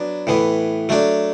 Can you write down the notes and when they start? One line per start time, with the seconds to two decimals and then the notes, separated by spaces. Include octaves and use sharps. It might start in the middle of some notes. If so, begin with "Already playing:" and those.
Already playing: F#3 B3 D4
0.27 A2 E3 B3
0.89 F#3 A3 D4